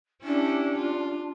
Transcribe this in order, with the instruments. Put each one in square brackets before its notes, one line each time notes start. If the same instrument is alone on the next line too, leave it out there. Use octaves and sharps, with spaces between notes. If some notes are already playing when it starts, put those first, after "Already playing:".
[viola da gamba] C#4 E4 G4 [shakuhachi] D4
[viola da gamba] F4